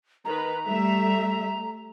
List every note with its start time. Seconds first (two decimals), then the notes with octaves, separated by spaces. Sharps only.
0.25 D#3 B4 A#5
0.66 G3 A3 E5